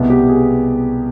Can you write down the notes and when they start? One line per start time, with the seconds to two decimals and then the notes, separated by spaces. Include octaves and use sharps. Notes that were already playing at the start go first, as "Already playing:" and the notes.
Already playing: C2 B2 G#3 B3
0.10 G4
0.29 G#4